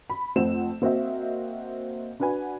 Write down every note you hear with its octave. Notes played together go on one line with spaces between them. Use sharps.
B5
F2 A3 C4 F#5 E7
A#3 C4 F#4 D#5 E5
D4 F#4 B4 F#5 G#5